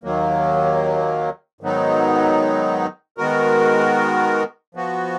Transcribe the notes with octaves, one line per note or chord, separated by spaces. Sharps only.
D#2 D#3 F#3 A#3
G#2 D#3 F#3 B3 D#4
D#3 G#3 B3 F#4 A#4
F3 B3 F#4